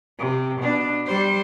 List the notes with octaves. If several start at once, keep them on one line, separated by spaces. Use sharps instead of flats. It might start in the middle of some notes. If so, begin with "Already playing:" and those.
C3
B2 D4
G3 C5